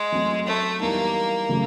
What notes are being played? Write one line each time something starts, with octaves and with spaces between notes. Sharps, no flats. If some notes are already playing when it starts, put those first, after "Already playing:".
Already playing: G#3
F#3 A3 C4
A3
E3 G3 A#3 B3 D#4
C#3 F#3 A3